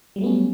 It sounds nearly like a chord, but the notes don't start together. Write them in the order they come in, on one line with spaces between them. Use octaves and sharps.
G3 F#3 A3 B3 C#4